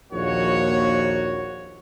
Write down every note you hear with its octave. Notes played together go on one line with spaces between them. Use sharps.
A#1 D#2 A#3 F#4 C#5